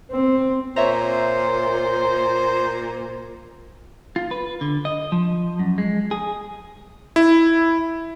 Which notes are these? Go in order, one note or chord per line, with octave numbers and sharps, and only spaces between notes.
C4
A#2 C5 C#5 E5 A#5
F4
B4
D3
D#5
F3
F#2
G#3
G#4
E4